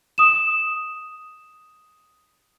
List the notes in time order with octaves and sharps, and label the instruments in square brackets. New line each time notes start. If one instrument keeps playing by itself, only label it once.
[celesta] D#6 E7